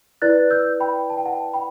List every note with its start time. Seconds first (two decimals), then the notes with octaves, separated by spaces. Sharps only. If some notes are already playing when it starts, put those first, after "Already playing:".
0.22 E4 B4 D5 F#6 A6
0.51 E6 G6
0.80 G5 B5
1.10 A5
1.17 G5
1.25 F#5 A5
1.54 G5 B5